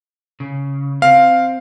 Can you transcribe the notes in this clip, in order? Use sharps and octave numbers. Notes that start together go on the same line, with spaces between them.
C#3
C4 F5